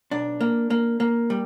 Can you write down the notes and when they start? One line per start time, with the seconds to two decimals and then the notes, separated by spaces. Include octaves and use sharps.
0.11 B1 D4
0.41 A#3
0.70 A#3
1.00 A#3
1.30 G3